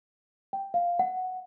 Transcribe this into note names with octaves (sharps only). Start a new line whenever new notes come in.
G5
F5
F#5